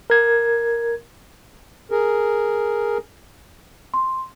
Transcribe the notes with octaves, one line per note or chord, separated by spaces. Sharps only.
A#4 G#6
G#4 A#4
C6